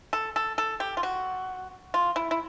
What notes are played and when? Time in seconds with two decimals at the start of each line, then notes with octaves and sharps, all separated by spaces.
0.13 A4
0.36 A4
0.58 A4
0.80 G4
0.97 F4
1.03 F#4
1.94 F4
2.16 E4
2.31 E4